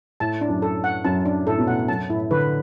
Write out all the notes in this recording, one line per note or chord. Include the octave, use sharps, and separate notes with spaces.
A2 A5
D4
F#2
A4
F#5
F#2 A5
D4
A2 A4
B2
A2 F#5
F#2 A5
A2 E4
D3 B4